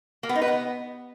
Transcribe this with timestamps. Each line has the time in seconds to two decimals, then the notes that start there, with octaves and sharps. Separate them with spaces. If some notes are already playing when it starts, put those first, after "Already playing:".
0.23 A#3
0.29 B3
0.35 D#4
0.42 B4
0.48 B3